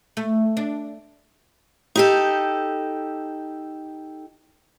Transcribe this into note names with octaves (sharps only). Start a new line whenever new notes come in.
A3
D4
D#4 G4 A4